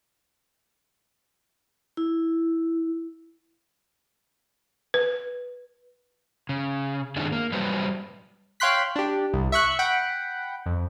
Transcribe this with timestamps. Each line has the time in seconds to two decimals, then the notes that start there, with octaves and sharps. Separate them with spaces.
1.97 E4
4.94 B4
6.49 C#3
7.16 G#2 D#3 C4 D4 E4 G#4
7.32 A#3
7.52 F#3 G3 B4 C5
8.60 C#5 F5 G5 C6 F#6 B6
8.96 D4 G4
9.33 C2
9.52 E5 C#6 F#6
9.79 F#5 G5 B5
10.66 F2